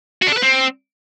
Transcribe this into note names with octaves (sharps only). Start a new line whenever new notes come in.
F#4
D4
A4
B4
C4